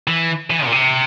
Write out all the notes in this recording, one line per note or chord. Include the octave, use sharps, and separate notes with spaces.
E3
E3
A#2
C3